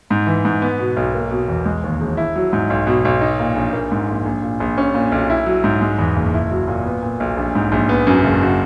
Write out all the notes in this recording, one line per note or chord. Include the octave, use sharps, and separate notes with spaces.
G#2
E3
G#2
B3
B2
B1
A#3
B2
E2
G#3
D#2
E1
E4
F#3
G#2
B1
B2
B1
D#4
A#2
A#1
A#3
G#2
A#1
A#1
A#2
A#1
C#4
A#2
B1
E4
F#3
G#2
G#3
E2
F#1
E4
F#3
A#2
B3
A#2
B1
A#1
G#2
A#1
B3
F#2
F#1
F#4